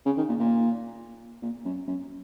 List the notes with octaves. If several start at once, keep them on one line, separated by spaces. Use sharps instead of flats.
C#3
D#3
A#2
A#2
A#2
F#2
F#2